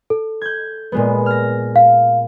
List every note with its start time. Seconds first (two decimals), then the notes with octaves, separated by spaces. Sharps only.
0.10 A4
0.42 G6 G#6
0.92 A#2 G#3 B3
1.26 F6 A#6
1.76 F5